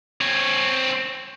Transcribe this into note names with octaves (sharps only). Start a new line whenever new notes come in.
C4 C#5